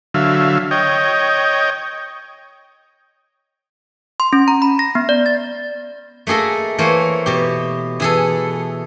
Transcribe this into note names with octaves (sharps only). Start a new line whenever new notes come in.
D3 F#3 E5 F5
C#5 D#5 G5
C6
C#4
A#5
B5
A#6
B3
D5
A6
A3 A#3 G#4 A4 D#5
E3 A3 A#3 C5 C#5
B2 G4
E3 G#4 A4